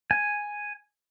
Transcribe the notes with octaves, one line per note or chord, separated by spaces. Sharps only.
G#5